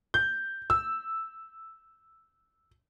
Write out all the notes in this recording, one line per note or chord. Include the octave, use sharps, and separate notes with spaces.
G6
E6